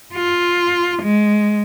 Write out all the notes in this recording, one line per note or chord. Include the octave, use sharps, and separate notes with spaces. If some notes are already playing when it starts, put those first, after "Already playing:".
F4
G#3